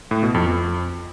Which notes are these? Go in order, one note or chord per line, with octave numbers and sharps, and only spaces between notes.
A2
B2
F2
F2